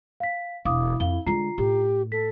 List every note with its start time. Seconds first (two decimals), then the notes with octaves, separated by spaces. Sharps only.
0.20 F5 B6
0.65 E1 E4 F5 D6 D#6
1.00 F2 F5 G7
1.26 D3 G#3 F4 A#5 C7
1.58 A2 G4
2.12 A4 B6